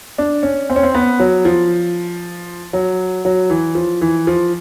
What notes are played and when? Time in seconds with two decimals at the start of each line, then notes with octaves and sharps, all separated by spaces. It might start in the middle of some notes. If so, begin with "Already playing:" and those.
0.18 D4
0.43 C#4
0.70 C4
0.76 C#4
0.83 C4
0.95 B3
1.20 F#3
1.45 F3
2.73 F#3
3.25 F#3
3.50 E3
3.75 F3
4.01 E3
4.27 F3